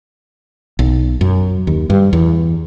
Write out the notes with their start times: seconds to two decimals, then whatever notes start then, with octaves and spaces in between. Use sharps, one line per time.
0.79 B1
1.21 F#2
1.67 D#2
1.90 G2
2.13 E2